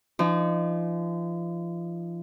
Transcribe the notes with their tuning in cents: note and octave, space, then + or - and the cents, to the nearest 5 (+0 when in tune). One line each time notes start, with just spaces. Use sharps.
F3 -35 D#4 -30